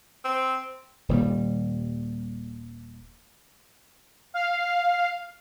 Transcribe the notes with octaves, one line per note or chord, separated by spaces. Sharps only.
C4
D#1 D#2 G3
F5